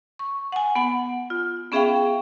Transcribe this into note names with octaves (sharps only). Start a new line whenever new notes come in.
C#6
F#5 G#5
B3 F#5
F4
B3 C#4 G#4 E5 F5 G5